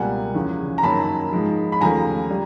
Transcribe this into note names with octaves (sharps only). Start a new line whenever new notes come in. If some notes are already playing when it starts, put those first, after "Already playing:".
Already playing: C#2 B2 G3 A#3 F#5 G#5
E2 C#3 F3
A#5
F#2 D#3 F#3 A#3 A5 B5
G#2 F3 G#3
B5
D#2 C#3 F3 A3 G#5 A#5
G3